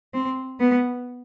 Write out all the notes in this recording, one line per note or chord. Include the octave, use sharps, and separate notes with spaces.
C4
B3